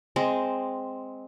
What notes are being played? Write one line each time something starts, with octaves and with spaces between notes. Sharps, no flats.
G#3 C4